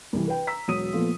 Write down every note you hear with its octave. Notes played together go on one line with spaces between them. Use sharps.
C2 C3 E3
B4 G5
A#5 E6 B6
E1 F#3 D#6 D#7
A#2 F3 A3 B3